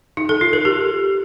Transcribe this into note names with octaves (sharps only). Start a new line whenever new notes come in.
D#4
A4
F4
A#4
G4